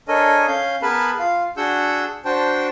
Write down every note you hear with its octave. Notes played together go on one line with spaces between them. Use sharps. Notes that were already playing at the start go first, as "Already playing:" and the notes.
D4 A4 A#4 C#5 D#5 G#5
C#4 F5 G6
B3 G#4 A#4 B4 A5 B5
F4 F5
D4 F#4 G#4 F#5 E6 G6
D4 F#4 C5 G5 A5